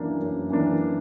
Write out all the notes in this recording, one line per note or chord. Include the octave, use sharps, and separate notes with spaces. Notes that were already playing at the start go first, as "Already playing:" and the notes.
Already playing: F#2 E3 A#3 D4
F#2
E3 A#3 D4